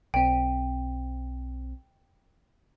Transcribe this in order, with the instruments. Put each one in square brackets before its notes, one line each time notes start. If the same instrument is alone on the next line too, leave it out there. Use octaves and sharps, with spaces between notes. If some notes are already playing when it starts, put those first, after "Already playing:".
[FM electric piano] B1 C4 [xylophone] G5